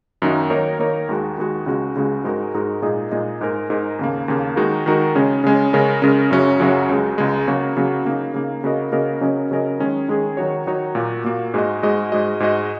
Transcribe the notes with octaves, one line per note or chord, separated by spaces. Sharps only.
F#2 D#3 A#3 D#4 F#4
D#3 A#3 D#4 A#4 C#5
D#3 A#3 D#4 A#4 C#5
D#2 D#3 G#3 F#4
D#2 D#3 G#3 F#4
C#2 C#3 G#3 F#4
C#2 C#3 G#3 F#4
G#2 G#3 D#4 F#4 A#4
G#2 G#3 D#4 F#4 A#4
A#2 G#3 D#4 G#4 D#5
A#2 G#3 D#4 G#4 D#5
G#2 G#3 D#4 A#4
G#2 G#3 D#4 A#4
D#2 C#3 A#3
D#2 C#3 A#3
D#3 G#3 D#4 F#4 A#4
D#3 G#3 D#4 F#4 A#4
C#3 G#3 C#4
C#3 G#3 C#4
C#3 G#3 C#4 A#4
C#3 G#3 C#4 A#4
F#2 C#3 F#3 C#4 F#4
F#2 C#3 F#3 C#4 F#4
C#2 C#3 G#3
C#2 C#3 G#3
C#3 F#3 A#3 F#4
C#3 F#3 A#3 F#4
C#3 A#3 D#4
C#3 A#3 D#4
C#3 A#3 F#4 A#4 D#5
C#3 A#3 F#4 A#4 D#5
C#3 F#3 C#4 A#4 D#5
C#3 F#3 C#4 A#4 D#5
D#3 G#3 C#4 G#4
D#3 G#3 C#4 G#4
D#3 F#3 D#4 F#4 C#5
D#3 F#3 D#4 F#4 C#5
A#2 A#3 F#4
A#2 A#3 F#4
G#2 G#3 F#4 D#5
G#2 G#3 F#4 D#5
G#2 G#3 F#4 D#5
G#2 G#3 F#4 D#5